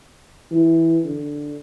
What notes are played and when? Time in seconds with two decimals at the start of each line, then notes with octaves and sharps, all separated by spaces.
0.51 E3
1.05 D3